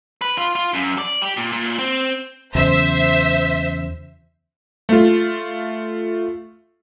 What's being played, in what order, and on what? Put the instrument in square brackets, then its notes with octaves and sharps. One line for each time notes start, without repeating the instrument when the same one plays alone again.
[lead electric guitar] B4
F4
F4
F#2
D5
G4
A#2
A#2
C4
[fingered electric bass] E2 C#3 F#3 [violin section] C5 E5
[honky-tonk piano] A3 F4